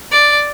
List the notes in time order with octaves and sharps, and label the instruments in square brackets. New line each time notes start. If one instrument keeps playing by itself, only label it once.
[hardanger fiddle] D5